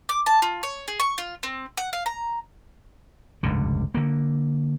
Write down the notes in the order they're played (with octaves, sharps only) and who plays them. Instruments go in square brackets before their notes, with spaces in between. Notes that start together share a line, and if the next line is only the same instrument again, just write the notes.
[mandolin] D6
A5
F4
C#5
G#4
C#6
F4
C4
F#5
F5
A#5
[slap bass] F1 C#2 G2 D3
D3 A#3